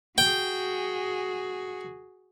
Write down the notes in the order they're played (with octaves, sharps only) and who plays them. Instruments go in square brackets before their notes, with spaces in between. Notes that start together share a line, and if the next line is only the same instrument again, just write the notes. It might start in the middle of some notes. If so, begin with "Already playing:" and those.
[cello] F#4 G#4 [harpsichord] G5